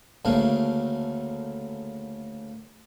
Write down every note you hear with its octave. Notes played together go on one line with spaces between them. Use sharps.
D2 C#3 A3 A#3